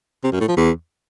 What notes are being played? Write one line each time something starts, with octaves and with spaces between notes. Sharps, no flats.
C3
F#2
A2
F3
E2